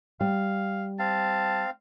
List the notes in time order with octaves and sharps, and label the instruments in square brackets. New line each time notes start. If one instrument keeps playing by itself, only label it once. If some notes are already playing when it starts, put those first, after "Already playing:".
[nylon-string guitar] G3 [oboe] F5
[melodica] C4 F5 [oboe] A5